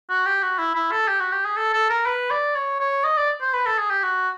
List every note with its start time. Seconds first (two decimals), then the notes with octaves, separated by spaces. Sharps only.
0.10 F#4
0.26 G4
0.42 F#4
0.58 E4
0.75 E4
0.91 A4
1.08 G4
1.20 F#4
1.32 G4
1.45 G#4
1.57 A4
1.73 A4
1.90 A#4
2.06 B4
2.30 D5
2.55 C#5
2.80 C#5
3.04 D#5
3.17 D5
3.41 C5
3.54 B4
3.66 A4
3.78 G#4
3.90 G4
4.03 F#4